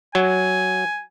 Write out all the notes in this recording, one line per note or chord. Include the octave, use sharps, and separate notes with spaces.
F#3 G#5